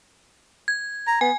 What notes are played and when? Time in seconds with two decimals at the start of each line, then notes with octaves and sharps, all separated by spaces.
0.68 G#6
1.07 A#5
1.21 B3 G#5